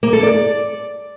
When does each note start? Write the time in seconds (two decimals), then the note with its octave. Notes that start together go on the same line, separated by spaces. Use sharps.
0.03 A#3
0.13 A4
0.23 D5